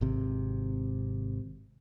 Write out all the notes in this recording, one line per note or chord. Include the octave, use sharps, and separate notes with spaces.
G#1 C3